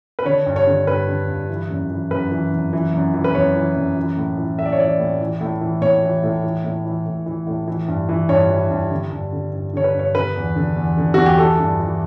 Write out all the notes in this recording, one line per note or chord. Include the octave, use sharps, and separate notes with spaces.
B4
D3 C#5
G2
C#5
D3
G2 B4
D3
G2
E3
F#2
E3
F#2 B4
E3
F#2
E3
F#2
E3
B4
F#2 C#5
E3
F#2
E3
A2
E3
A2 E5
D5
C#5
E3 D5
A2
E3
A2
E3
A2 C#5
E3
A2
E3
A2
E3
A2
E3
A2
E3
G2
E3
G2 C#5
E3
G2
D3
G2
D3
G2
D3 C#5
B4
G2
C#5
D3 B4
E2
D3
E2
D3
E2 F#4
G4
E3 A4
G2
E3